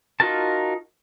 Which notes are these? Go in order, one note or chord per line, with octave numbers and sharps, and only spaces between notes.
D#4 F4 F#4 A#4 A5